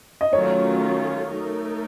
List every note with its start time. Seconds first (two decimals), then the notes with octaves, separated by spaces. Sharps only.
0.21 D#5
0.33 D#3 F#3 A3 C#4 F4 C#5
1.29 A3 D#4 A#4